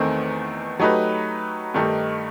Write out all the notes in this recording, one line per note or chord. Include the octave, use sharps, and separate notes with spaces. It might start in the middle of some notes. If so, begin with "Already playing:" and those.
Already playing: E2 D#3 A3 C4
F#3 A3 D#4 G4 B4
G2 D#3 A3 D#4 G4